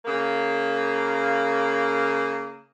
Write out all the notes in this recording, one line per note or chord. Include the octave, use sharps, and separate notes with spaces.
C#3 A#3